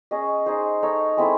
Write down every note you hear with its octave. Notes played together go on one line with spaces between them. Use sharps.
C#4 G#4 D#5
D#4 G#4 C5
D#4 A4 C#5
G#3 C4 E4 A4